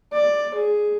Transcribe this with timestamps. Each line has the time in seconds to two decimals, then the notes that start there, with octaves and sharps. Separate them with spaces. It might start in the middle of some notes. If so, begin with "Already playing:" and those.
0.12 D5
0.54 G#4